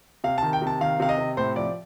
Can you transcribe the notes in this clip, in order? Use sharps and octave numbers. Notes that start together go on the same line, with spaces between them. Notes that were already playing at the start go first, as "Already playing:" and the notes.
C3 F5
D#3 A5
G5
C3
A5
D#3 F5
C3 F5
D#5
C3
A2 C5
F3 D5